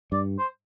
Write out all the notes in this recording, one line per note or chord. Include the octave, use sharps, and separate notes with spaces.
G2 D5
C5